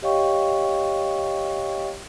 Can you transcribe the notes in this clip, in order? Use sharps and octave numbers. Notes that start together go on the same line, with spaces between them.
G4 C#5 D#5 F5 G5 C#6